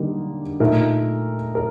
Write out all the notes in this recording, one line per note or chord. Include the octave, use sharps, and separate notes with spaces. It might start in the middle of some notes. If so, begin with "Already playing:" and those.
Already playing: D3 G3 A#3 D#4
A#2 A3 D#4 A#4
A#4